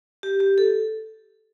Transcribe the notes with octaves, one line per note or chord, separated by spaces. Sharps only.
G4
G4
A4